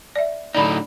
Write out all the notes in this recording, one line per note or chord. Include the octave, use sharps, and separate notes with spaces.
D5 E5
A2 D3 D#4 D5 B5